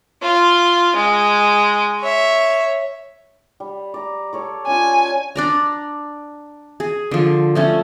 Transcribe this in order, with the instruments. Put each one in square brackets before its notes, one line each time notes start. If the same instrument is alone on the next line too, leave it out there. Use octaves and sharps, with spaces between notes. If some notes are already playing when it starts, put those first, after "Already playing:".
[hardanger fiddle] F4
G#3
C#5 E5
[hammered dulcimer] G3
D5 A#5
A4 C#5 D5
[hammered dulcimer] C#4 F4 [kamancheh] G#5
[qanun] D4 D5 A#5
G#4
D3 F3
F3 A3 C#4